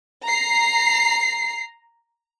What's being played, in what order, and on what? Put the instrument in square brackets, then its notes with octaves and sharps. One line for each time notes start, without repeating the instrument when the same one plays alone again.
[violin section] A#5 C7